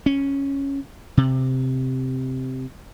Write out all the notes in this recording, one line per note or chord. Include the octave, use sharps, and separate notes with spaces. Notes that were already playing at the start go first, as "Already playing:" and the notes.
C#4
C3